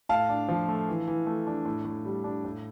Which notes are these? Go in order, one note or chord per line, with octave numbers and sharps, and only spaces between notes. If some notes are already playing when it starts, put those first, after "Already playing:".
A2 F5 A5
D4
F3
A3
E3
E3
A3
D4
A2
A2
G3
D4
A2